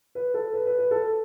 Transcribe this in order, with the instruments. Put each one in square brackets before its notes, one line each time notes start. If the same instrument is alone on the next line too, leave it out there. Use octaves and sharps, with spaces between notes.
[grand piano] B4
A4
B4
B4
B4
A4